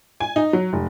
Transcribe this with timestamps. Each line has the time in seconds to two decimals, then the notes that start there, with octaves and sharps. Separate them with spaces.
0.20 G#5
0.36 D#4
0.53 F#3
0.73 F1